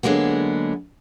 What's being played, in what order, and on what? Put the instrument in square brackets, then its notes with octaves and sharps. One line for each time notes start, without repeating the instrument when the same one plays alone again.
[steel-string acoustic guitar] D3 F#3 G#3 A#3 B3